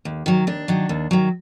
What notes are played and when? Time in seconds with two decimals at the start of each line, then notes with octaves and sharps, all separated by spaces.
0.05 D#2
0.26 D#3 F#3
0.47 D#2 D4
0.68 D#3 F#3
0.89 D#2
1.11 D#3 F#3